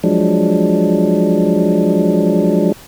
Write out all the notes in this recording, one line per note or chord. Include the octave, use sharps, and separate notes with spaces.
F3 F#3 G#3 D4